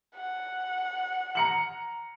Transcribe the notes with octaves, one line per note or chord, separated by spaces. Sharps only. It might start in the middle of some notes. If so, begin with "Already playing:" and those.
F#5
A#5 C#7 F#7